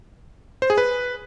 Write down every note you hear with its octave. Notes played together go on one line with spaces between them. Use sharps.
C5
G#4
B4